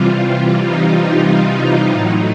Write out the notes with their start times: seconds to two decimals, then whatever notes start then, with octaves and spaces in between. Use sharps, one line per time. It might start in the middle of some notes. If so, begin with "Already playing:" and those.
Already playing: C3 E3 G3 F4
0.66 D#4
1.28 D#4
1.92 A2 F#3